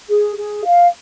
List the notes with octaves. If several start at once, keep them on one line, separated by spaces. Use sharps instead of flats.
G#4
G#4
F5